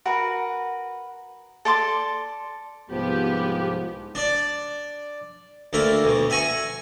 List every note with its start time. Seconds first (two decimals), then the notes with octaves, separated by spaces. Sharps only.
0.06 F#4 A#4 B4
1.65 A4 D5 C6 D6
2.91 C2 G#2 F3 B3 G4
4.15 D4 D5
5.73 D2 D3 A#3 E5 F5
6.04 D2 B2
6.30 E5 F#5 G#5 A#5 C#6